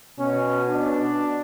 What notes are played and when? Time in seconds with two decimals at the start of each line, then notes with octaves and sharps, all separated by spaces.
0.19 B2 C#4
0.68 D4